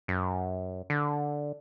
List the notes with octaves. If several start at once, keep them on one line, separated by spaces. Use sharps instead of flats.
F#2
D3